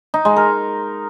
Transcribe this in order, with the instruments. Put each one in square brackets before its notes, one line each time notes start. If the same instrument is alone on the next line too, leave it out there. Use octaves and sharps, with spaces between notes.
[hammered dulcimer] D#4
G#3
A#4